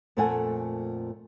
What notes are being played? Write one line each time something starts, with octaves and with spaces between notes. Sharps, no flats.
F2 A#2 A3 A4 F#5 G#5